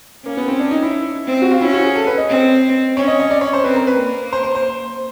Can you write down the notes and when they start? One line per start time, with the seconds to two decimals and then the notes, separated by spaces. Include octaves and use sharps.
0.26 A#3 C#4
0.37 B3
0.48 C4
0.60 D4
0.71 D#4
0.83 E4
1.27 C4
1.42 F#4
1.52 F4
1.61 C#4 E4
1.73 F#4
1.84 G#4
1.95 A4
2.07 B4
2.18 D#5
2.29 C4
2.96 C#4 C#5
3.08 D#5
3.20 D#5
3.31 D5
3.41 C#5
3.53 C5
3.64 C4 B4
3.75 A#4
3.87 B4
3.98 A#3
4.33 C5
4.43 C5
4.55 C5